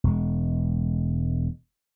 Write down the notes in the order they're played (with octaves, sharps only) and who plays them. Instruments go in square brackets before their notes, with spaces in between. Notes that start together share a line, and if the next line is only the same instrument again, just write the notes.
[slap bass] E1 G#3